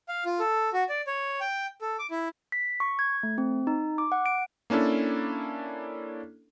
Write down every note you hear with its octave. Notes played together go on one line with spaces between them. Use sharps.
F5
F4
A4
F#4
D5
C#5
G5
A4
D6
E4
B6
C#6
G#6
A3
C4
D#4
D6
F#5
D7
A#3 C#4 D4 E4 A4